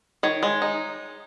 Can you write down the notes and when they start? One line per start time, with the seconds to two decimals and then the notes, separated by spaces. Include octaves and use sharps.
0.23 D#3 C#5
0.43 G#3
0.62 D#4